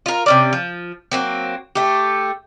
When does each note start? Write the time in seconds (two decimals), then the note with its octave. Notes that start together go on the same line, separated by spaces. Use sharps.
0.06 F4 A#4
0.26 C3 C#4 D5
0.53 F3
1.12 F#3 A#3 C4
1.75 A3 G4